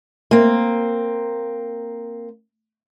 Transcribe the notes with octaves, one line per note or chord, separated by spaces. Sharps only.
A#3 C4